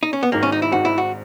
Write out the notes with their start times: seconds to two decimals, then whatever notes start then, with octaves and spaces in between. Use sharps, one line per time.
0.03 D#4
0.13 C#4
0.23 B3
0.32 G#1 G#2 D#3 A#3
0.43 C#4
0.52 D#4
0.62 E4
0.72 G#1 G#2 D#3 F#4
0.85 E4
0.98 F#4